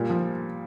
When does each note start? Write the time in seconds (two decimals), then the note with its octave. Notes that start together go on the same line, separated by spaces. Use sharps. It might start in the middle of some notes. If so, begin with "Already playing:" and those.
Already playing: A#2 G3
0.09 F3